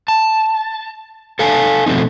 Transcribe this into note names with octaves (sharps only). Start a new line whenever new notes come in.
A5
A4 F5 G#5 A5
B2 F3 A3 C4 D#4